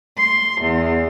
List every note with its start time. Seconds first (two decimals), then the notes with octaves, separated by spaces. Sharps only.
0.16 C6
0.61 E2